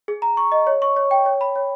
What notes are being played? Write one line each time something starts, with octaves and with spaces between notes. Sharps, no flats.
G#4
A#5
C#6
D#5
C#5
C#6
C#5
G5
C#5
B5
C#5